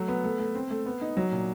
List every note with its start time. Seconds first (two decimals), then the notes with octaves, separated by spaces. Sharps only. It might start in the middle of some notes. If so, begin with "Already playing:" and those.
Already playing: F#3 A3
0.08 B3
0.24 A3
0.39 A3
0.55 C4
0.70 A3
0.86 B3
1.01 D#4
1.17 F#3
1.32 A#2